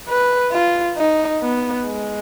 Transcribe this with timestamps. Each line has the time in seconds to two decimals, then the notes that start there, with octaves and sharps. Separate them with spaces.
0.08 B4
0.52 F4
0.97 D#4
1.42 B3
1.86 G#3